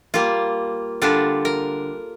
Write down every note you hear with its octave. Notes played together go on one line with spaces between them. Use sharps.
G3 A#3 F4
D3 G3 D4 F4
A#4